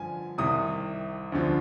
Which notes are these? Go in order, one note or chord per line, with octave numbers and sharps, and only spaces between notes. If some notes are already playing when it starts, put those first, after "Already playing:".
Already playing: G2 D3 F3 G#5
C2 C3 D#3 D#6
D2 D3 F3